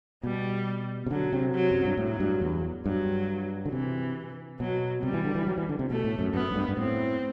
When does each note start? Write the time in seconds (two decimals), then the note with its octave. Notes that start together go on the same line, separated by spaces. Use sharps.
0.23 B2 G3
1.06 C3
1.11 D3 F#3
1.33 C3
1.54 F#3
1.71 F#2
1.85 G2
1.97 A2 F#3
2.20 G2
2.41 E2
2.85 G2 F#3
3.65 D3
3.72 C3 E3
4.59 B2 F#3
5.03 C3 G3
5.14 E3
5.25 D3
5.35 E3
5.47 F#3
5.58 E3
5.69 D3
5.79 C3
5.90 B2 A3
6.04 A2
6.19 F#2
6.34 F#2 B3
6.51 F#2
6.56 G2
6.68 G2
6.77 A2 C4